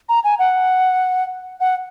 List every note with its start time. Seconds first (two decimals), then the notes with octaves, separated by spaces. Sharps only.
0.09 A#5
0.24 G#5
0.39 F#5
1.60 F#5